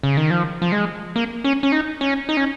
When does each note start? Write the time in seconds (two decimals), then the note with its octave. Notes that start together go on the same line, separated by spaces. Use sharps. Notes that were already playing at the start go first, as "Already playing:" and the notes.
0.03 C#3
0.17 D#3
0.30 F3
0.62 F3
0.72 G#3
1.16 A#3
1.44 C#4
1.63 C#4
1.72 D#4
2.01 C#4
2.29 D#4
2.37 C#4